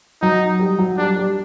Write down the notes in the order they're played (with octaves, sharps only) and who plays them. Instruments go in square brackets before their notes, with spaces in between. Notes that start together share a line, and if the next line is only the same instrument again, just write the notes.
[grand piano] F#3 [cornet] D#4
[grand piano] G3
F#3
[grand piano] G3 [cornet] D4
[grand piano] G3